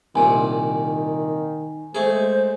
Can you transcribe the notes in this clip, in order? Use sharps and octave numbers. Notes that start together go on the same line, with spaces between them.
C2 A#2 D#3 G#5
G#3 A3 G#4 C5